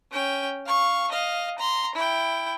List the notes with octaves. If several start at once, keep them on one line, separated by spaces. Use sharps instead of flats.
C#4 G5
F5 C#6
D#5 F5
A#5 C6
E4 G5